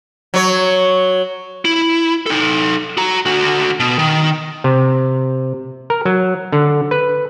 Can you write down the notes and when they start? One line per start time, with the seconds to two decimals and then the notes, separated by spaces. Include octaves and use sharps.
0.34 F#3 C#5
1.65 E4
2.26 D#4 A4
2.97 F#4 A#5
3.26 D3 F#4
3.80 B2
3.99 D#3
4.64 C3
5.90 A#4
6.05 F#3
6.52 D3
6.91 B4